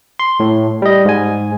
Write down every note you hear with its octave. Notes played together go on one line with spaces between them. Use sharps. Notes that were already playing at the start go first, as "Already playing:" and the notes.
C6
A2
G3 D#5
G#2 G#5